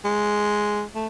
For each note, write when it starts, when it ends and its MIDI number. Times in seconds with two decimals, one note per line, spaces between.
0.05 0.83 56
0.95 1.07 57